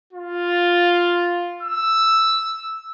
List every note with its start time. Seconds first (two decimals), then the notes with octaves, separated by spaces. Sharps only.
0.13 F4
1.62 E6